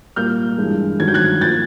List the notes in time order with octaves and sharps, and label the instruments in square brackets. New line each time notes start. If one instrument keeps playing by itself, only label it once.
[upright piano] A#2 G3 A#3 F6 G6
G2 E3 G#3
G2 D#3 F#3 A3 G#6
G6
F#6 G#6
F3 A#3 G6 A6